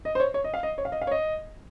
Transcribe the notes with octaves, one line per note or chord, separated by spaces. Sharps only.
D#5
C5
C#5
C#5
D#5
F5
D#5
C#5
F5
D#5
F5
C#5
D#5